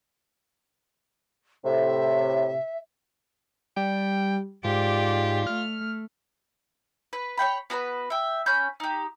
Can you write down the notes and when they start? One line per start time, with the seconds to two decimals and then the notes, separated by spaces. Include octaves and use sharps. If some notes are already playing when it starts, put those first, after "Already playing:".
1.65 A2 C3 E5
3.77 G3 G5
4.65 G#2 F4 G4 D5
5.47 A3 F6
7.13 B4
7.37 C#5 F#5 G5 B5
7.70 B3 F#4 A#4 B4
8.10 E5 G5
8.46 C#4 B5 G6
8.80 D#4 G4